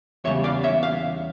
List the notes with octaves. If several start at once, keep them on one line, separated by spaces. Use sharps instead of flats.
E2 C#3 G3 C#5 E5
D5 F5
C#5 E5
F5